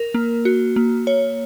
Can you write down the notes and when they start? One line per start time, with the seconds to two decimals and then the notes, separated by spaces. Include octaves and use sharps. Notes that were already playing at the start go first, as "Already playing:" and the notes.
Already playing: A#4
0.14 A#3
0.45 F#4
0.76 A#3
1.07 C#5